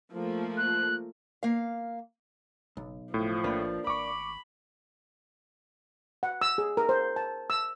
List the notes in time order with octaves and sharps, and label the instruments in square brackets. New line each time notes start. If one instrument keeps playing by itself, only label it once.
[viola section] F3 A3 A#3
[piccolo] F#6
[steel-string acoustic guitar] A#3 F5
[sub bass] F#1 [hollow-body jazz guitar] B1
[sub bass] F#1 [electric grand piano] A2 [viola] F3
[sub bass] A#1 [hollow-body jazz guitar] A#3 D4 B4
[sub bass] G#1 [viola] B5 [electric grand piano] C#6 D6
[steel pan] F#5
E6
G#4
A#4
C5
A5
E6